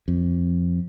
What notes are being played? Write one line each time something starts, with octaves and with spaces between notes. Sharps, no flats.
F2